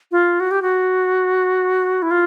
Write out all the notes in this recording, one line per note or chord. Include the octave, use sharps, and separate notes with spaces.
F4
F#4
G4
F#4
E4
F4